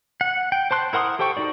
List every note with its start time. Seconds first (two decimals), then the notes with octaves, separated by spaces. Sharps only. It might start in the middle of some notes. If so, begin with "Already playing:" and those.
0.21 F#5
0.52 G5
0.71 C5 A5 C6 F#6
0.93 E4 A#4 F#5 C6 D#6
1.19 G4 A4 C5 G5 C#6
1.37 D#4 F#4 D5